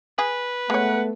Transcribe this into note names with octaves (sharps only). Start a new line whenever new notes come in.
G#4 B4
G#3 A3 B3 C#5 F#5